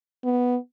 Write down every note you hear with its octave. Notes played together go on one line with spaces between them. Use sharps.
B3